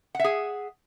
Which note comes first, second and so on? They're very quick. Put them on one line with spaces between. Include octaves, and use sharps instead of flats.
F#5 E5 G#4